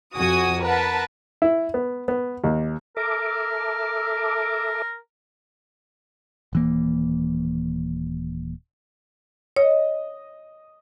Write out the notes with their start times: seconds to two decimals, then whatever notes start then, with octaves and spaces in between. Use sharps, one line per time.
0.15 F2 F#4 G#5 D#6
0.63 A#4 B4 F#5 A5
1.42 E4
1.74 B3
2.08 B3
2.44 D#2
2.97 A4 A#4 E5 D6
6.53 D#1 E3 A#3
9.56 C#5 D#5